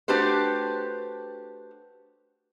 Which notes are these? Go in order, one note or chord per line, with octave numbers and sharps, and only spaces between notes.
A3 D4 F#4 G4 B4 C5